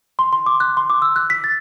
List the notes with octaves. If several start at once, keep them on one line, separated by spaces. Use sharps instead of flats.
C6
C6
D6
F#6
C6
D6
E6
F#6
B6
A6